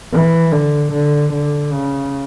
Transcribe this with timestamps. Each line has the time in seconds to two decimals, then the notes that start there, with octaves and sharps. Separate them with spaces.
0.13 E3
0.52 D3
0.92 D3
1.33 D3
1.72 C#3